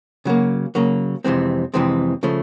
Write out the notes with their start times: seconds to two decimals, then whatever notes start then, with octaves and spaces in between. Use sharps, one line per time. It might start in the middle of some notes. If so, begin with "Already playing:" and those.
0.25 C#3 F#3 A#3
0.75 C#3 F#3 A#3
1.24 F2 C3 E3 G#3 C4
1.74 F2 C3 E3 G#3 C4
2.23 C#3 F3 A3